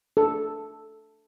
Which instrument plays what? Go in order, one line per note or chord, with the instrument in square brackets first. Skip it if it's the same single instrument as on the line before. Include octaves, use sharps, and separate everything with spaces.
[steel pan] A4